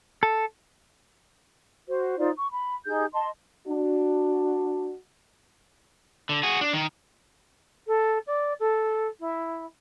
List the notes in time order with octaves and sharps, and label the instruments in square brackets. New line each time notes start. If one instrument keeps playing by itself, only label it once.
[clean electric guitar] A4
[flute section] F#4 C5
D#4 F4 C5 D5
C#6
B5
D#4 G4 G#4 G6
D#5 A5 C6
[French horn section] D4 F#4
[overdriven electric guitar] D3
F#4 G#4
D4
D#3
[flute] A4
D5
A4
E4